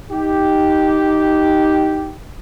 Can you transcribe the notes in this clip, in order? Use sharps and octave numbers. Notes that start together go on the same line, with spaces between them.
D#4 G4